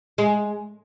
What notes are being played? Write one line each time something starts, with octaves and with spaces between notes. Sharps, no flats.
G#3